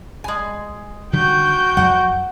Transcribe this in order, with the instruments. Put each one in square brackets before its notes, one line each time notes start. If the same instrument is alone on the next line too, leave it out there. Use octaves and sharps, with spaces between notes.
[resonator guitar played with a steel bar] G#3 G#5
[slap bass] D3 D#3 G3 [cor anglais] F#4 [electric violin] G5 G6
[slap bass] F2 F#3 [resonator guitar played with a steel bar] F#5